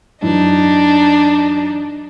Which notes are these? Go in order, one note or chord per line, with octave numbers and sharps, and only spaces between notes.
F#2 E3 D4 D#4